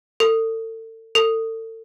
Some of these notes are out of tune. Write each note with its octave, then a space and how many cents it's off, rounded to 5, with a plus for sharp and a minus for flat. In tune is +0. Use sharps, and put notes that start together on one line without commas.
A4 +35
A4 +35